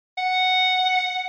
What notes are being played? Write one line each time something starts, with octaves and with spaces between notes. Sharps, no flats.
F#5